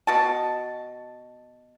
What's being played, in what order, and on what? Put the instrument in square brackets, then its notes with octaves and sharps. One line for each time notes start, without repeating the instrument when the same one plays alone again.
[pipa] B2 F#4 A5